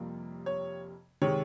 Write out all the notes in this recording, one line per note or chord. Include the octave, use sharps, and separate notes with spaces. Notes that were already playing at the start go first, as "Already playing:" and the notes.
Already playing: F2 C3 G3 A#3
C#5
C3 D#3 G#3 C#5